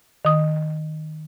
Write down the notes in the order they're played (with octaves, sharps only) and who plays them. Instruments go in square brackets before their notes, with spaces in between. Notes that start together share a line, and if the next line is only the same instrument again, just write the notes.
[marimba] D#3 D#6